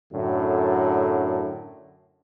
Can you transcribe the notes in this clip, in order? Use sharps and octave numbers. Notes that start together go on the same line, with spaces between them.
F#2 A2 D3